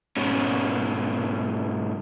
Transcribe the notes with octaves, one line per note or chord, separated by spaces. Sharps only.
G#2 B2 C#4